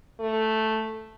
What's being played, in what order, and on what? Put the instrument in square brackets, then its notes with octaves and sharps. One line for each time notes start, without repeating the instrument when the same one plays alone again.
[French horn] A3